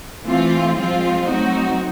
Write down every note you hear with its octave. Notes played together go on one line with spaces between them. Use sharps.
E3 A3 C4 F4
F3 G#3 C4 F4
F#3 A3 C4 D#4 F#4